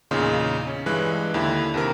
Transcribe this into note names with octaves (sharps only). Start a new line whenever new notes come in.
E2 A#2 C#3 D#4 C6
C#4
G2 E3 G#3 F#6
D#2 D3 E4 B5
D#2 C3 A#4